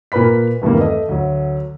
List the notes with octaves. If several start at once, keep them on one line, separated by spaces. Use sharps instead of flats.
A#2 A#4 B4 B5 B6
E2 G2 C3 D#3 A#3
A3 D#5
D2 F#3